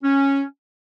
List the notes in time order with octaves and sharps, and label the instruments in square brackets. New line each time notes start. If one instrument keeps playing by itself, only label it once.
[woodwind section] C#4